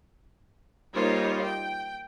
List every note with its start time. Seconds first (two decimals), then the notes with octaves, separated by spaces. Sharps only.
0.94 G3 A#3 D#4 F4 C5 C#5
1.44 G5